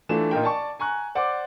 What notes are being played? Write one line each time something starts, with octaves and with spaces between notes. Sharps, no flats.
E3 A3 D4 F4 E7
A#2 D#4 A#4 G5
D5 A5 C#6
G#5 A#5 C#6 F#6
C5 D5 F#5 D6